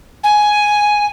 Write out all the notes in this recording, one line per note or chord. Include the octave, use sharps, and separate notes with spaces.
G#5